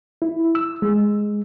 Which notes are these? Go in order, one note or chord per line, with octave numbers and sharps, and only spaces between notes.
E4
E6
G#3